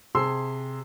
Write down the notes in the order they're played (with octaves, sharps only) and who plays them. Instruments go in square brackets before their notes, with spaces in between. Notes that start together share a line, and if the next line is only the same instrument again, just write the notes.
[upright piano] C3 G#4 A5 C6 E6 C7